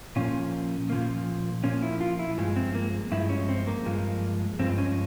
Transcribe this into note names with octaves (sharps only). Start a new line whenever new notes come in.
A#2 F3 A#3 C#4
A#2 F3 A#3
A#2 F3 A#3 C#4
E4
F4
E4
G2 F3 G#3
C4
A#3
G2 F3 G#3 E4
C#4
C4
A#3
G2 F3 G#3
G2 F3 G#3 C4
C#4